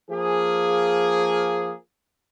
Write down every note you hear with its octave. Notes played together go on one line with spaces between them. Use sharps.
F3 A#3 G#4